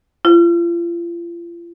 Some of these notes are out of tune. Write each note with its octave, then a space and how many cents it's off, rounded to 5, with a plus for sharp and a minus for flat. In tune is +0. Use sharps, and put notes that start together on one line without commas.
F4 -40